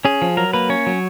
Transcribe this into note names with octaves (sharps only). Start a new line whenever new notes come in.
C#4 G#4
F3
F#3 A#4
A#3 B4
C#4 C#5
F#3